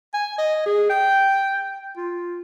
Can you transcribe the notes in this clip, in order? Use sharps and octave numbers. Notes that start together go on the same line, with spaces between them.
G#5
D#5
G#4
G5
F4